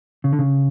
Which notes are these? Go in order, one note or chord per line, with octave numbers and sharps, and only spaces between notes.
C#3
D3
C#3